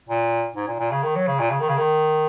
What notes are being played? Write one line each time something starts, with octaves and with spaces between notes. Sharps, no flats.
A#2
G#2
A#2
A#2
C#3
D#3
F#3
C#3
A#2
C#3
D#3
C#3
D#3